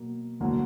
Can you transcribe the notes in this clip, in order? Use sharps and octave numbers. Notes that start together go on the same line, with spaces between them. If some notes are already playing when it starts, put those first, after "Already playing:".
Already playing: B2 F#3 A#3
D2 D3 F#3 A#3